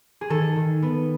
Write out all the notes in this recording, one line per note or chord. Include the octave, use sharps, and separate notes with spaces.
G#4
D#3 A4
D#3
B3